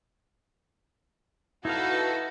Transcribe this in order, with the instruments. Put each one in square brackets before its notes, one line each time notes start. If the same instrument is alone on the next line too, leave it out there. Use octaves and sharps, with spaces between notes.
[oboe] D#4 [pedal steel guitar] E4 F5 [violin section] F#4 A4 B4